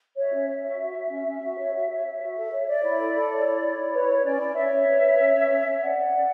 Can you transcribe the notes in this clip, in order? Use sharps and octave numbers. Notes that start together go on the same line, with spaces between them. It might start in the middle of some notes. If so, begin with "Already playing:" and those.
F#4 C#5 E5
C#4
C#5
F#4
F#4
F#4
C#4
C#4
F#4
C#5
F#4
C#5
C#5
F#4
A4
C#5
C#5 D5
E4
A4
A4
C#5
E4
C#5
E4
B4 C#5
B4
C#4 D5
E4
C#4 C#5 E5
C#4
B4
B4
C#4
C#4
C#4
C#4
C#4 D5 F#5
C#4
C#4